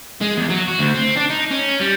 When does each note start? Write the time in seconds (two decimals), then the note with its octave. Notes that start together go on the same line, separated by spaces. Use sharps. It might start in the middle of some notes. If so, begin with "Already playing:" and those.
0.21 G#3
0.37 E2
0.49 F#3
0.68 F#4
0.79 D2
0.95 C4
1.16 D4
1.30 D#4
1.51 C#4
1.80 G3